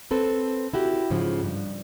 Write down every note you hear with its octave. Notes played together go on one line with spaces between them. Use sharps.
C4 A4 B4
E4 F#4 G4
G#2 C#3 F3
G2